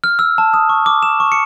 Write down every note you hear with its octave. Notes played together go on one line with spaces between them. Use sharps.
F6
E6
A5
D#6
C#6
D6
E7
C#6
C#7